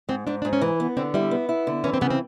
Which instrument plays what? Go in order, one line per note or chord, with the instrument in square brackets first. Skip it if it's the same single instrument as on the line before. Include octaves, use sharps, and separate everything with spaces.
[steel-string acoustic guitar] G#2 [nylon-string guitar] C4
[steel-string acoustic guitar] G#2 [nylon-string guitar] D4
[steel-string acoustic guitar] G#2 [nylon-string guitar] D4
[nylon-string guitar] C#4
[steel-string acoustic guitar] E3
B3
[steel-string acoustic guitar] D3 [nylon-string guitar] C4
[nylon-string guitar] G3 [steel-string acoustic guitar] E4
[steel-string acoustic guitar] B3
E4
D3
[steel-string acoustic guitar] E3 [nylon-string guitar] C#4
[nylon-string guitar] C4
[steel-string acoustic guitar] C#3 [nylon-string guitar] B3
[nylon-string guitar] C4